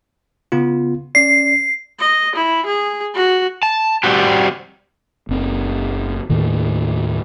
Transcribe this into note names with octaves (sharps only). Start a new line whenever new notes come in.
C#3 B3 F4
C#4 D5 C7
D#5
E4
G#4
F#4
A5
G3 C4 F#4 G4
F#1 C4
D#2 A2 D#3